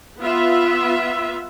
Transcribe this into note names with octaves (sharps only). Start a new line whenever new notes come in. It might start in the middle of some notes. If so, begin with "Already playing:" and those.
B3 F4 E5